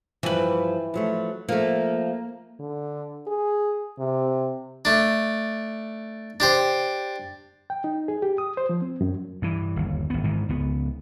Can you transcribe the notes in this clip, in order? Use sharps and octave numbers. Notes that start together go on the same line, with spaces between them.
G2 E3 F3 B4
F3 F#3 A3
F3 A3 A#3
D3
G#4
C3
A3 D4
D4 G4 C5
G5
D#4
G#4
G4
D#6
C5
F3
C4
F#2
G2 E3
G1 D#2
G#1 B3
G#2 D#3 E3
C#2 B3